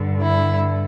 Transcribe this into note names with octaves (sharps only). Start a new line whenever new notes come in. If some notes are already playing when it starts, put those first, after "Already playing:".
Already playing: G2 D3
E4